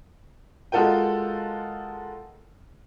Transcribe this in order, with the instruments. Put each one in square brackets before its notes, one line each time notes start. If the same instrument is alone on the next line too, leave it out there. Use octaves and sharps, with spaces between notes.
[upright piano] G#3 F4 F#4 A4 A#4 G5